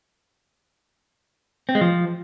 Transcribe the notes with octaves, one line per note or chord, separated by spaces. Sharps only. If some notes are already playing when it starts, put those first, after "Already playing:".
C4
G#3
F3